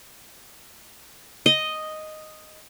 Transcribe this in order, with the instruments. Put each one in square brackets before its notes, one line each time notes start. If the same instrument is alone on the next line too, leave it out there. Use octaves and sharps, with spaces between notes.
[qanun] D#5